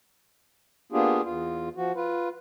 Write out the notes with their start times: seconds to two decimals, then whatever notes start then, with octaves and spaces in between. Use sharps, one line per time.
0.92 A#3 B3 D4 F4 G4 G#4
1.24 E2 F4
1.76 F3 F#4
1.95 F4 B4